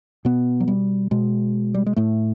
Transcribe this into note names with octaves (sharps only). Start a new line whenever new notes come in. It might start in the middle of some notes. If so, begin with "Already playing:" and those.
B2 B3
F#3
G3
B2 G#3
G3
G#3
A2 A3